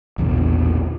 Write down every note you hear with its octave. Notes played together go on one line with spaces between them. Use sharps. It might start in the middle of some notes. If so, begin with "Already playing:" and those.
A#1 E2 B2 D3